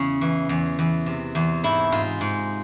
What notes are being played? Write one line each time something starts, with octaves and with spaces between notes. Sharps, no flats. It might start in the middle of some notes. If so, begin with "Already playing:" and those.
Already playing: E2 C#3 C#4
E3
E2
E2
C3
E2
G#2 E4
G#2 F4
G#2